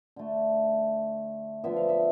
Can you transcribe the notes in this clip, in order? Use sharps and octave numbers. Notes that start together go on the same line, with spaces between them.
D3 A3
D3 F3 B3 E5
F5
E5